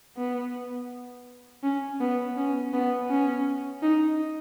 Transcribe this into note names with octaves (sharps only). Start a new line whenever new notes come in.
B3
C#4
B3
C#4
B3
C#4
D#4